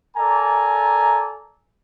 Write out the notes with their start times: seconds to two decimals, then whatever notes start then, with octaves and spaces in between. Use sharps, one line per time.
0.17 A4 A#4 D5 G#5 A#5